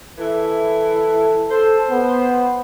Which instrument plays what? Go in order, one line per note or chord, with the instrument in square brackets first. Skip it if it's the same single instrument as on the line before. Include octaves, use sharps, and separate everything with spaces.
[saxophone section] E3 E4 [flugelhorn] A4
[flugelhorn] A4 [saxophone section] C5
[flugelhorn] B3